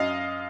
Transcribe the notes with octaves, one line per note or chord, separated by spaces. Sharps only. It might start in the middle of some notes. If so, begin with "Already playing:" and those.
Already playing: F#2 D#5 F5